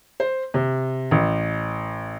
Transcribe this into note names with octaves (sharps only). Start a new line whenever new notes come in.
C5
C3
A1